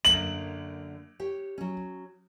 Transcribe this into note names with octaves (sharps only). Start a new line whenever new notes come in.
F#2 D3 A#3 F#7
G4 C#5
F#3 C#4